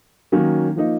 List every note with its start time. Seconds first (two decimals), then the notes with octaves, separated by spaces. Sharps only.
0.32 D#3 F#3 A#3 C#4
0.76 F3 A#3 D#4